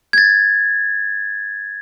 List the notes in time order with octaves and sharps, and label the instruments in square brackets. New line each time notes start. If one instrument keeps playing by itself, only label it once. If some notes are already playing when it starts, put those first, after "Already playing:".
[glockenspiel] G#6 A6